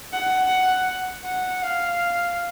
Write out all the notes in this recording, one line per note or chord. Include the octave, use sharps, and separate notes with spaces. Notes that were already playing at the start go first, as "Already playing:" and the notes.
F#5
F#5
F5